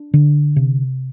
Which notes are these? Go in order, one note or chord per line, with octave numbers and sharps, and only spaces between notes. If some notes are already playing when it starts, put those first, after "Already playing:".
Already playing: D4
D3
C3